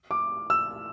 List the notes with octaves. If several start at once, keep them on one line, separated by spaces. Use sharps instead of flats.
D6
E6